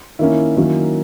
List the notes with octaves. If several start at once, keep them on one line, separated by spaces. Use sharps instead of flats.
D#3 A#3 C#4 E4
D#3 F#3 A#3 C#4